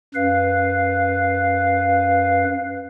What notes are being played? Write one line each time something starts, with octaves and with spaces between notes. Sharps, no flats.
F#2 B4 F5